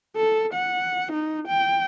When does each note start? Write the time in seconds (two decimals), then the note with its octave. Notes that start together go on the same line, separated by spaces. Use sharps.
0.17 A4
0.54 F#5
1.12 D#4
1.48 G5